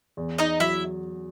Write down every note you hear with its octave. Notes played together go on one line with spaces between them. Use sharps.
E2
D#4 D#5
F#3 E4 E5